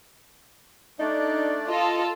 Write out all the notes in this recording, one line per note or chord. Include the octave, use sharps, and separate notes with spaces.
A3 D4 D#4 D5
F4 A4 D#5